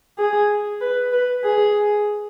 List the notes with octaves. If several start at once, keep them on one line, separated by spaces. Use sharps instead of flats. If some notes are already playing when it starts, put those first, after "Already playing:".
G#4
B4
B4
G#4